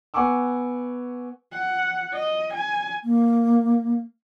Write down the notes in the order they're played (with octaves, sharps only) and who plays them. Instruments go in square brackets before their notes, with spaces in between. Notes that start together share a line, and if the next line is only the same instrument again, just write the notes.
[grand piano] B3 F#5 G#5 C#6 D6 E6
[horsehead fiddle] F#5
D#5
G#5
[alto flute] A#3